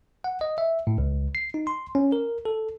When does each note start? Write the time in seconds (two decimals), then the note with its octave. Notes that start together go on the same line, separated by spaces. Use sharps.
0.24 F#5
0.41 D#5
0.58 E5
0.87 A2
0.98 C#2
1.35 C7
1.54 D#4
1.67 C6
1.95 C#4
2.12 A#4
2.45 A4